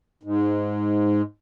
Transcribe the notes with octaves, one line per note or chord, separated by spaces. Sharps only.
G#2